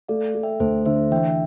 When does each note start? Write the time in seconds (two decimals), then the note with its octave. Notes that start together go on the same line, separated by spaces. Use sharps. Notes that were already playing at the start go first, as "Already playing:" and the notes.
0.09 A3 D5 F5
0.35 A3
0.43 E5 G5
0.60 D2 A4 C5
0.85 D3 C5 E5
1.11 E3 E5 G5